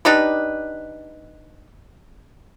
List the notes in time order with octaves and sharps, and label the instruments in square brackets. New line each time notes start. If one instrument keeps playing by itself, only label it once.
[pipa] D4 D#4 G4 B4